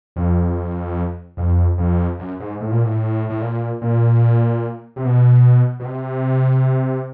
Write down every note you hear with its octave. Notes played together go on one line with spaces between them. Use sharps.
F2
F2
F2
F#2
G#2
A2
A#2
A2
A2
A#2
A#2
C3
B2
B2
C3